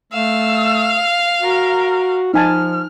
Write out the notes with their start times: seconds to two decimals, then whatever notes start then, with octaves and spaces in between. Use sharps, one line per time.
0.12 A3 F5 E6
1.42 F#4 A#4
2.34 F3 D#4 G#5 A5 F6